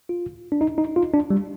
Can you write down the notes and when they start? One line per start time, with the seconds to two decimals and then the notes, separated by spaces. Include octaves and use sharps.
0.09 F4
0.52 D4
0.61 D#4
0.78 D#4
0.96 F4
1.14 D4
1.30 G3